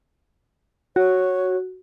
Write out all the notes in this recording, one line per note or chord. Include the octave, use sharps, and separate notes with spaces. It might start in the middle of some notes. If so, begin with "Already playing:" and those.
F#4 C#5